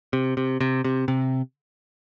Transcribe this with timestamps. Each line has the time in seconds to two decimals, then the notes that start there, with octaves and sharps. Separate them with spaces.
0.13 C3
0.37 C3
0.61 C3
0.85 C3
1.08 C3